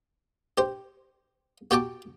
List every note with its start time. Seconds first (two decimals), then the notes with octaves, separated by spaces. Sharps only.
0.58 G4 C5
1.71 F#4 G4 G5 A5 D6